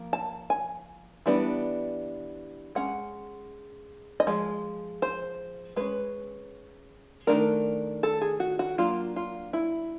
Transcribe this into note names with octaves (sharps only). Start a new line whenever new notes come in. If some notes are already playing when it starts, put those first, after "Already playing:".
Already playing: F3 A#3
A5
G#5
E3 G3 B3 D4
G#3 C#4 F#5
D#5
F3 G#3
C5
G#3 C#4 B4
D#3 F#3 A3 D4 A#4
A4
G#4
F#4
F#4
F#3 A#3 D4 F4
F4
E4